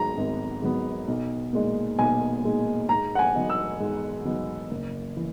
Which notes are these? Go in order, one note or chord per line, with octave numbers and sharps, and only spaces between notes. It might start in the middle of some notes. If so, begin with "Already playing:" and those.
Already playing: G#2 F#3 B3 A#5
G#1
G#2 F#3 B3
B1
A#2 G#3 D#4
B1 G#5
A#2 G#3 D#4
G#2 A#5
F#5
G#5
F#3 B3 D#4
E6
G#2
F#3 B3 D#4
F#1
E3